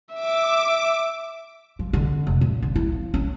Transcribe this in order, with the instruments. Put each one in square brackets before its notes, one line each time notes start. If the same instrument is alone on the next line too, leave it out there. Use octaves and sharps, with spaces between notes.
[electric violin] E5 [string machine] D6
[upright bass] F3
D3
F1
A#1
D3
E4
F3
C#4